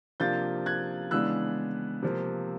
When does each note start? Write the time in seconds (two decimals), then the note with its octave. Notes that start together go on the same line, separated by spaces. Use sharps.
0.20 C3 F3 A#3 D4 F4 G6 A6
0.66 F#6 G#6
1.11 C#3 E3 G#3 B3 D4 E6 F#6
2.02 C3 F3 A#3